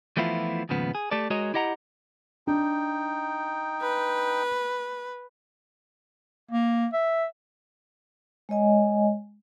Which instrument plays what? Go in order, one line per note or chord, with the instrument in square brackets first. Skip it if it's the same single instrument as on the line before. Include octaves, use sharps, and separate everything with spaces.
[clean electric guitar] E3 F3 A3 B3 E4 F4
D#2 G#2 C#3 F3 B3
G#4
A3 G4 A4 D5
G#3 F#4 G#4 A#4 C#5 D#5
E4 G4 D#5 F#5 A#5
[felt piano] D4 [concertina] D#4 G5
[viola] B4
[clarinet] A#3
E5
[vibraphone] G#3 C#5 D#5 G#5